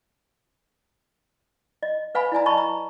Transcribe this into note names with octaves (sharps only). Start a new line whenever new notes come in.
D#5
B4 F5 G#5 B5
E4 D5 G#5 A#5
D#5 A5 B5 C#6
A#5